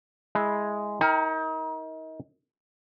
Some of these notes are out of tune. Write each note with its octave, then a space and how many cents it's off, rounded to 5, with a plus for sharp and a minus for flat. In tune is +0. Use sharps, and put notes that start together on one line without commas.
G#3 +0 E4 -5
D#4 +35 A#4 +0 G5 +0